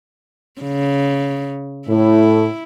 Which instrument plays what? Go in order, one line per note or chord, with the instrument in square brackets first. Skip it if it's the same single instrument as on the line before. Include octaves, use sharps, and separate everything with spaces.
[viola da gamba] C#3
[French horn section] A2 [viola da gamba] E4